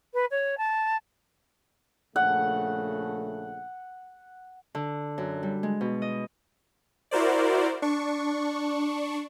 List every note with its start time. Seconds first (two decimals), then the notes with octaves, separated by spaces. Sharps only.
0.13 B4
0.30 C#5
0.57 A5
2.16 A#1 C#3 A3 F#5
4.75 D3
5.18 F#2
5.43 G3
5.63 G#3
5.81 B2
6.02 D#5
7.11 E4 F#4 A#4 C5 D5
7.82 D4 C#6